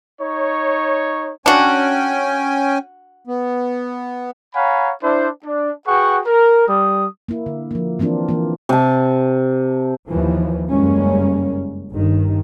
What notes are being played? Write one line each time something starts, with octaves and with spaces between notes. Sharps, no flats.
D#4 C#5
C#4 D4 F#4 G5 G#5
B3
C#5 F5 F#5 G#5 A#5 B5
D4 E4 C5
D4
F#4 G#4 B4 F#5 G5 C#6
A#4
G3 D#6
A#3 E4
D3
F3 A#3
E3 A#3 C4 D4 F4
E3 A#3
C3 A5
D#2 E3 F3
F#1 G2 G3 G#3 A#3 C#4
G1 G2 D#3